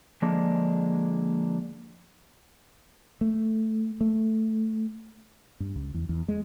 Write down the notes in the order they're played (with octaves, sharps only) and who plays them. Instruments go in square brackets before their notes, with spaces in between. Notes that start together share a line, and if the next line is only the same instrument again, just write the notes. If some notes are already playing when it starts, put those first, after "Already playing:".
[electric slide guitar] D3 F3 G#3 A#3 D4
[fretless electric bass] A3
A3
G2
C#2
E2
E2
G#3